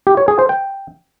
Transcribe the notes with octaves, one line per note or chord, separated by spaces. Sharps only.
G4
C#5
G#4
C5
G5